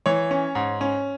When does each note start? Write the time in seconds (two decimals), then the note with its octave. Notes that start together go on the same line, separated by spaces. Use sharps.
0.06 E3 C#5
0.31 C#4
0.55 G#2
0.81 C#4